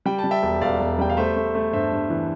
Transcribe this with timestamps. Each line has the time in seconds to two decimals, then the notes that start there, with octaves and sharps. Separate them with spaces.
0.06 G3 G5
0.19 A5
0.24 G3
0.31 E5 G5
0.43 E1
0.61 E1 D5 F5
0.80 E1
0.99 G3 G5
1.10 F5
1.17 A3 C5 E5
1.36 A3
1.55 A3
1.73 G2 C5 E5
1.92 G2
2.10 E3